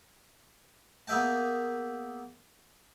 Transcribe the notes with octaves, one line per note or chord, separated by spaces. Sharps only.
A#3 B3 G#4 E5 G5 A5